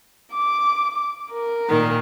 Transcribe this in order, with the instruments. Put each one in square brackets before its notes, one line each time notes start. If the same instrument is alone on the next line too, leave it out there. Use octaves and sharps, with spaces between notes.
[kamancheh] D6
A#4
[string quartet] A#2 D#3